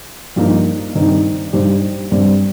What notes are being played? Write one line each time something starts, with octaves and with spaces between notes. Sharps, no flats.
G2 F3 A#3 D#4
G2 D#3 C4 D#4
G2 G3 D#4 G4 C5
G2 G3 C4